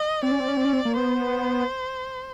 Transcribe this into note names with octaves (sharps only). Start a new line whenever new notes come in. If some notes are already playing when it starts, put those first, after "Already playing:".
Already playing: D#5
C4 D5
C#4
C4
C#4
C4
C#4
C4
A#3
B3 C5